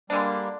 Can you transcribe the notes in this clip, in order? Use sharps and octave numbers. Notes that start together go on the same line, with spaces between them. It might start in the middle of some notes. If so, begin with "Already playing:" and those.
D3 G3 G#3 A#3 D4